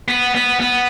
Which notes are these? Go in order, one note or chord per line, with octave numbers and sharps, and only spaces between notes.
B3
B3
B3